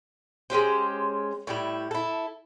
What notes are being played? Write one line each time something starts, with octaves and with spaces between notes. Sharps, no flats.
G#3 C#4 G4 C5
A2 G3 E4
E4 A4